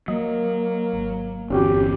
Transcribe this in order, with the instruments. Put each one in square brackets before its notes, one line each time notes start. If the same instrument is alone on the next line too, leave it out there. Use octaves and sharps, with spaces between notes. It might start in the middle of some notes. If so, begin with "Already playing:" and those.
[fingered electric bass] F#3 [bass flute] A#3 [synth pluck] D#5
[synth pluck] G#1
[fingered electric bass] G1 E2 [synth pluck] C4 C#4 F#4 [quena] G4